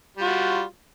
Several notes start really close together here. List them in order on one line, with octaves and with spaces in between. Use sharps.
G3 F#4 F4